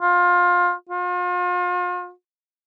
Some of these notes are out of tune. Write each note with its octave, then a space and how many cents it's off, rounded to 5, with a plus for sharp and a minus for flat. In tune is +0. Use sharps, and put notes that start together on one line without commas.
F4 +20
F4 +40